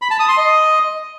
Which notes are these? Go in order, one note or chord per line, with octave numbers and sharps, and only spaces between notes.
B5
A5
D#6
C6
D#5